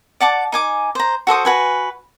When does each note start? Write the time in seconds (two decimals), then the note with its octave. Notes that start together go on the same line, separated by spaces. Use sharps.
0.21 D5 F#5 A5 D6
0.52 D#4 G#5 D6
0.95 C5 A#5
1.27 F#4 A4 C5 D#6
1.45 F#4 B4 G#5